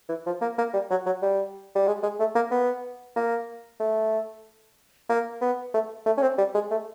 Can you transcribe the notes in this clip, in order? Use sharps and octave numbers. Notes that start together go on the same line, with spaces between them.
E3
F3
A#3
A#3
G3
F#3
F#3
G3
G3
G#3
G#3
A3
A#3
B3
A#3
A3
A#3
B3
A3
A3
C#4
C4
G3
G#3
A3